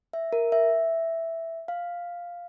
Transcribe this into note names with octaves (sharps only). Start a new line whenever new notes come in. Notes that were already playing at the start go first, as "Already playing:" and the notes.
E5
A#4
E5
F5